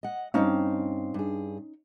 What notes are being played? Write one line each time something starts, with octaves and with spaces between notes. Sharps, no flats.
D#5 F#5
G2 C4 C#4 D#4 F5
G2 G#4